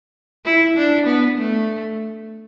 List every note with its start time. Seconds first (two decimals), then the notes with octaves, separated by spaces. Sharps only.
0.45 E4
0.77 D4
1.06 B3
1.37 A3